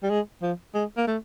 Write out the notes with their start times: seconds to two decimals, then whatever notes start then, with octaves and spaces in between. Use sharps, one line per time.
0.03 G3
0.10 G#3
0.42 F3
0.75 G#3
0.97 A#3
1.07 A3